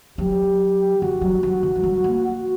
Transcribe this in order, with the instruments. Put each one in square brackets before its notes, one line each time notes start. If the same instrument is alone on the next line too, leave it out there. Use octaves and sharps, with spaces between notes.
[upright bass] F#3 [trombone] G4
[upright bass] E3 [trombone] F#4
[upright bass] F#3
F#3
E3
G3
F#3
A#3
[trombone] F#4